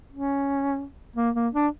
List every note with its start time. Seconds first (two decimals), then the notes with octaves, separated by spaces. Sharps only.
0.13 C#4
1.16 A#3
1.35 A#3
1.54 D4